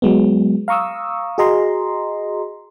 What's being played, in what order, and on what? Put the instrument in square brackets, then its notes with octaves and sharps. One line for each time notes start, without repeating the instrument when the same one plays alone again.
[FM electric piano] F#3 G#3 B3
F5 A#5 C#6 D#6 E6
F#4 G#4 D#5 A#5 C6